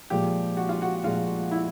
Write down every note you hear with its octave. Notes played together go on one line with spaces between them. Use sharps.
A#2 F3 G#3 G4
F#4
F4
F#4
A#2 F3 G#3 F4
E4